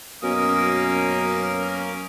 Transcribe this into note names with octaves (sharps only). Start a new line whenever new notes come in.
F#2 B2 A#3 C#4 A#4 D#6